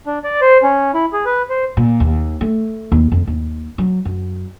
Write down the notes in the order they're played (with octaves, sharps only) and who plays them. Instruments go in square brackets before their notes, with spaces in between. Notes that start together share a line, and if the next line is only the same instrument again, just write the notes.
[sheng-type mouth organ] D4
D5
C5
C#4
E4
G#4
B4
C5
[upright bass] A#2
D#2
A3
D#2
F2
D#2
F#3
F#2